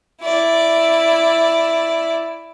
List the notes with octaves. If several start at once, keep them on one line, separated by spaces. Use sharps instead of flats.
E4 D5